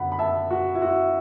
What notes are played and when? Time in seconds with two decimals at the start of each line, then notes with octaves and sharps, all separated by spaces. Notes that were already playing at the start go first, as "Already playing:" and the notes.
Already playing: F#2 D3 F#5 B5
0.12 B5
0.19 E5 A5
0.51 F#4
0.75 E4
0.82 F#4